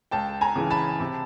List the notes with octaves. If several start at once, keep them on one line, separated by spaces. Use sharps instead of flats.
C#2 G5 A5
G#5 A#5
C#3 E3
A5 B5
C3